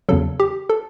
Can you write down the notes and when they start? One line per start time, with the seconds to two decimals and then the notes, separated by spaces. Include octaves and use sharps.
0.09 E2 C#3 F#3 A4
0.40 G4
0.69 A4